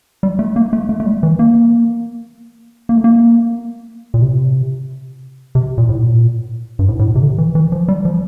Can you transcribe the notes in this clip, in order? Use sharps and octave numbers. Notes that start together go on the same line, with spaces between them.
G3
A3
A#3
A3
A3
A3
G3
E3
A#3
A#3
A3
A#3
A#2
C3
C3
A#2
A2
A#2
G2
A2
A2
A#2
C3
D3
E3
E3
F3
G3
F3